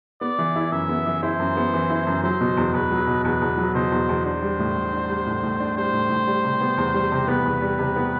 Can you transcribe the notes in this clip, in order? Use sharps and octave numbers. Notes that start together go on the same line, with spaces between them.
B3 D5
E3
E4
F#2 E5
B3
E3
E4 C5
F#2
B3
E3
E4
F#2
F#3 C5
B2
E2
E2 B4
F#3
B2
E2 B4
E2
F#3
B2 C5
E2
E2
D4 C5
G3
A2
A2
D4
G3
A2
A2
D4
G3 C5
A2
A2
G3
C3
B3
E2
G3
C3
B3 B4
E2
G3
C3
B3